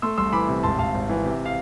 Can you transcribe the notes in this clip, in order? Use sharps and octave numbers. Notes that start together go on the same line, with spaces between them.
A3 C6 E6
C2 C6 E6
E3 B5 D6
C3
G#1 A5 C6
G#1 F5 A5
G#1
E3
C3
F5